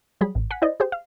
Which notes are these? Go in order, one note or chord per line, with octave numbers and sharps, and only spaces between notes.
F#3 G3 G#4 B5
A1
F#5 G#5 B6
E4 C5 D5 D#5
G4 G#4 C5
F5